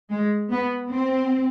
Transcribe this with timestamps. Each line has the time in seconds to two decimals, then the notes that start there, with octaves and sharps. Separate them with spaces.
0.10 G#3
0.51 B3
0.91 C4